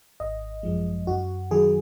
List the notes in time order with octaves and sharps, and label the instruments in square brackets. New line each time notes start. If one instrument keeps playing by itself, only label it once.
[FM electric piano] G#1 D#5
F#2 F3 G#3
F#2 F#4
D#3 F#3 G#4